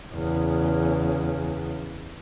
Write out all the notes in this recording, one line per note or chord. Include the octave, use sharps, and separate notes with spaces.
E2 C#3